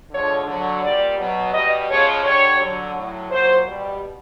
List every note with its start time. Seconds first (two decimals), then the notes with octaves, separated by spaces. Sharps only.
0.11 D3 F3 G#3 C#5
0.46 D3 F#3
0.81 A#2 G3 D5
1.17 B2 F#3
1.53 B2 G3 D#5
1.89 C#3 F3 G#3 C#5
2.23 D3 G3 C#5
2.59 D3 F#3
2.94 A2 F#3
3.29 A#2 F#3 C5
3.66 B2 G3